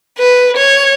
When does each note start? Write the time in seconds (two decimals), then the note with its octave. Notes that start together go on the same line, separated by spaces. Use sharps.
0.18 B4
0.57 C#5